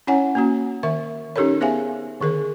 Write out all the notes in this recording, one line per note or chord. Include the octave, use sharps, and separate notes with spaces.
C#4 E4 C#5 F#5 G#5
A#3 C#4 F#4
D#3 A#4 E5
C#4 D#4 G4 A4 A#4 C#5
B3 G#4 C5 E5 F5 G#5
D3 D#3 G#4 A#4